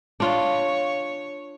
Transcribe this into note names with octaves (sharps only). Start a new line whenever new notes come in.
D4 F4 C#5